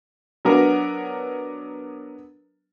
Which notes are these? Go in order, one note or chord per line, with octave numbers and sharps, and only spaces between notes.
F#3 B3 D4 A#4